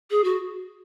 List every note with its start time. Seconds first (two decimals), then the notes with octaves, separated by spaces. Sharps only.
0.11 G#4
0.24 F#4